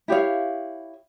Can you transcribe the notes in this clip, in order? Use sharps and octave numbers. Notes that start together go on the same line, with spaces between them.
E4 G4 C#5 F5